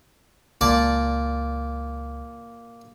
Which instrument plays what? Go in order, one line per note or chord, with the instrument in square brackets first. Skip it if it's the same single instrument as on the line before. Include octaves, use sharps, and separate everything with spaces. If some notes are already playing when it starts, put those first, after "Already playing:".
[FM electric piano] C#2 [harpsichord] A#2 D5 A5